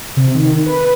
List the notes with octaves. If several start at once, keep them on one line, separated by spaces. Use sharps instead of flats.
C3
D#3
B4